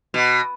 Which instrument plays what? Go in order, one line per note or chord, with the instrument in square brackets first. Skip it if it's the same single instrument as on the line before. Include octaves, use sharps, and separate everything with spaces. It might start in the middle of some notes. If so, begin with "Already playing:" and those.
[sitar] B2